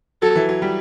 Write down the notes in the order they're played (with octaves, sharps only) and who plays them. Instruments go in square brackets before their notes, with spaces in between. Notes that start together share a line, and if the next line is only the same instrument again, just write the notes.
[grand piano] F#3 [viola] A4
[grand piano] E3
F#3
G3